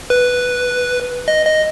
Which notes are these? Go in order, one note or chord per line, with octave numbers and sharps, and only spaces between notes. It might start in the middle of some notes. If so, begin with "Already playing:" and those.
B4
D#5
D#5